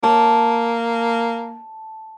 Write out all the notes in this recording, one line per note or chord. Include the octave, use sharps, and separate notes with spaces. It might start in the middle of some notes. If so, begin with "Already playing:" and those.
A#3 A5